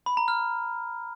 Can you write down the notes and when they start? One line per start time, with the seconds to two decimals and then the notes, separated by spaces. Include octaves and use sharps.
0.06 B5
0.17 A#5
0.28 F6